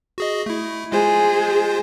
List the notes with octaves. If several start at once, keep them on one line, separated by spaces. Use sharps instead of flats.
F#4 G#4 D#5
A3 E4
G#3 F4 G#4 C5